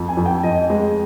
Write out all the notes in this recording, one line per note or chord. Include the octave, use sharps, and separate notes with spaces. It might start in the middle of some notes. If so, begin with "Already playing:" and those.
Already playing: F2
G#5
F2
G5
F2 D#5
G#3